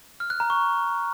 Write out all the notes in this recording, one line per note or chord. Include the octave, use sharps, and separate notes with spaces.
F6
F#6
A#5
C#6